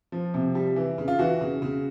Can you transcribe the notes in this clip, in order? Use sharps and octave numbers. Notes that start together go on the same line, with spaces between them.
F3
C3
G3
E3
C#3
F4
E3 F#4
C#3
C#3